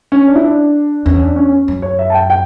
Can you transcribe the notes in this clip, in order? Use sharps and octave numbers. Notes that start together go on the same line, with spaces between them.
C#4
D4
E4
D4
E2 C#4
D4
C#4
C#4
F#2
C#5
E5
A5
G5
G5